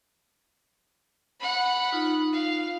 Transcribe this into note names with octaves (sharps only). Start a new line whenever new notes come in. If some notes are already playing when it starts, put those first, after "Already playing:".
F#5 B5
D#4 F4
F5